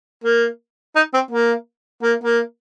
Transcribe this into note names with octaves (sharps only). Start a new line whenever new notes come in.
A#3
D#4
C4
A#3
A#3
A#3